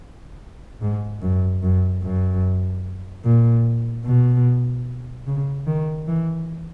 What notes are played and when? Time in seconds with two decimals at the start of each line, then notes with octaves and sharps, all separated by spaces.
0.82 G#2
1.22 F#2
1.63 F#2
2.03 F#2
3.24 A#2
4.05 B2
5.27 C#3
5.67 D#3
6.07 E3